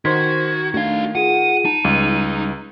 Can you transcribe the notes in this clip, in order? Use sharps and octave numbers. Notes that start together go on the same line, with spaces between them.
D#3 F#4 C5 C6 G#6 B6
A3 D4 D#4 F#4 F5
F4 G#4 F#5 D#7
D#4 A5
C#2 G3